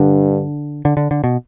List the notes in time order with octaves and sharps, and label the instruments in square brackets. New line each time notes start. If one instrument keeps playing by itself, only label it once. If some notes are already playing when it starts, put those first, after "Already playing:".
Already playing: [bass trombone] G2 [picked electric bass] D3
[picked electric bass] D3
D3
D3
B2